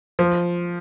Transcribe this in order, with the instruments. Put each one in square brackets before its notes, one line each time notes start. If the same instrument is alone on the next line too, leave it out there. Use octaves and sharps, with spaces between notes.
[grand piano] F3